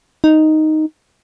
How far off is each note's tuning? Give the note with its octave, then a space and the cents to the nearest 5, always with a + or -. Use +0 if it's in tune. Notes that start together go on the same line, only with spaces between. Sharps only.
D#4 +0